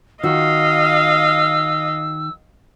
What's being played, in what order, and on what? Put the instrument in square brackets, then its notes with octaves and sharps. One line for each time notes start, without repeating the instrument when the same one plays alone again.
[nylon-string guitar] D#3 F4 F#4 [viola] D#5 F5 [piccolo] E6